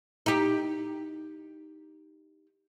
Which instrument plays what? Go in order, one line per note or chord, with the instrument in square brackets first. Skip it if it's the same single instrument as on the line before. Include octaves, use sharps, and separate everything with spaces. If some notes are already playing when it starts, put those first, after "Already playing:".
[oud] D#4 G4